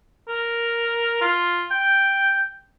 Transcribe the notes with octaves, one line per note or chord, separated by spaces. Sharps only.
A#4
F4
G5